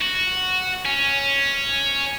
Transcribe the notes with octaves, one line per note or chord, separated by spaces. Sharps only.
F#4
C#4